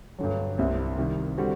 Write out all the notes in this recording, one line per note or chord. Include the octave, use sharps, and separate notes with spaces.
G2 D3 F#3
C2 C3 G3 C4
C3 D#3 G3
D3 G3 C4 F#4